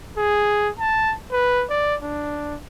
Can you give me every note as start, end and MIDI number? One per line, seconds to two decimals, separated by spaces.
0.17 0.70 68
0.79 1.15 81
1.32 1.65 71
1.70 1.96 74
2.02 2.55 62